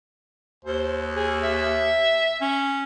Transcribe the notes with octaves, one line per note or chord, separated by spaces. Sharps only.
D#2 C5
G#4
E5
C#4